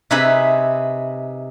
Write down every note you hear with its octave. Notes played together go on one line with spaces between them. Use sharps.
C3 D#4 G#4 B4 E5 B5